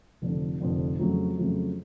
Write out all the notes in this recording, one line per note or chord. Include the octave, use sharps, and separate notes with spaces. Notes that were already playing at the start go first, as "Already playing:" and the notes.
F1 F2 D3
F1 F2 D3
F2 C#3 F#3 A3
F2 C#3 F#3 A3